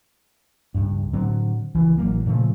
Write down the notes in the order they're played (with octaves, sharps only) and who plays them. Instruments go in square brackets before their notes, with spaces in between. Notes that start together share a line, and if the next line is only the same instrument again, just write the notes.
[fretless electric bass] C#2 G2
A2 D3 F#3 C4
C#2 E3
A1 F#3 A#3
A#2 C#3 F3 A3